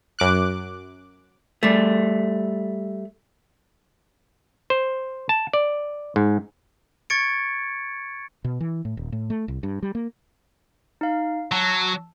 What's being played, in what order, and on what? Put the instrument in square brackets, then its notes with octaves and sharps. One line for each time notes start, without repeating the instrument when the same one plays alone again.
[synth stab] F#2 D6 F#6
[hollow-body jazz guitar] G3 A3
[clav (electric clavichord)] C5
A5
D5
G#2
[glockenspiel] C#6 G#6 A6 C#7 D7
[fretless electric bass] B2
E3
A2
D#1
A2
A3
C2
G2
G3
A#3
[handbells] D#4 F5
[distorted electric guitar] F#3 [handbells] A5 E6